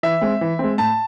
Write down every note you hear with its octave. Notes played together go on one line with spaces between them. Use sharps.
E3 E5
G#3 C4
E3
G#3 C4
A2 A5